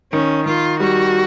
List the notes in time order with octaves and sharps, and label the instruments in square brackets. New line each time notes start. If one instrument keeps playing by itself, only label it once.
[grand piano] D#3 [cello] C#4
[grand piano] D#3 [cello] F4
[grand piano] G3 [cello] F#4